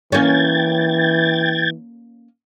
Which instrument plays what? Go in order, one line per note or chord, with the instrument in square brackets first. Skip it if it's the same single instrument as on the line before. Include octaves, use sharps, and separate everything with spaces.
[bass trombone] E3 [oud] A#3 C#4 [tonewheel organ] G5 G#6 A6